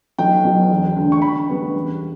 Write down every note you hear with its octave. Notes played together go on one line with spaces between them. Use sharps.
B1 G5
B2 F#3
E1
D2 D3
C#6
E1 B5
D2 C#3 G3 B3
E1